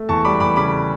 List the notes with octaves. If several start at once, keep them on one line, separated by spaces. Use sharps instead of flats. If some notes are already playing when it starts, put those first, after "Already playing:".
Already playing: A3
E2 A5 C#6
G3 B5 D6
E2 B5 D6
C#3 B5 D6